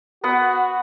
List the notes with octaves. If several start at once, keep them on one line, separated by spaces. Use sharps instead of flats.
B3 F#4 B4 F#5